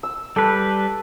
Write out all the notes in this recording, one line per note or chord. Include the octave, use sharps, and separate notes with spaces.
E6
G3 A4 B4